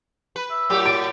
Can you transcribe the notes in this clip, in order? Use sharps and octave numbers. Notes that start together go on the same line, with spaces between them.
B4
E5
A2 F#3 G4
D5 D7